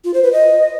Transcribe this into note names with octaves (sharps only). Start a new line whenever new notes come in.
F4
C5
B4
D#5